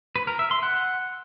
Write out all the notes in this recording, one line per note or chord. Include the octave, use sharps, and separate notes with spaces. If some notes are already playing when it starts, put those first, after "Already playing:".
B4
A#4
E5
C6
F#5